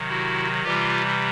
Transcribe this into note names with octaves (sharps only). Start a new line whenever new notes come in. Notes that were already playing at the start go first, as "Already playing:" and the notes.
Already playing: C3 D#3 F#3
E4 F#4
C3 E3 G3 F4 G4